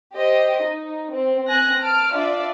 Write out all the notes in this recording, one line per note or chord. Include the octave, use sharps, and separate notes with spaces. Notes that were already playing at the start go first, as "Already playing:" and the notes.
G4 C5 D#5
D#4
C4
C4 G#5 F#6 A#6
A5 F6 D7
D4 F4 D5 E5